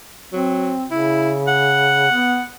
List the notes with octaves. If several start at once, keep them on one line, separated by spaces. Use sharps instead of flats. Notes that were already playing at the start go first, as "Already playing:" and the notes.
F#3 C4
C#3 E4
F#5
B3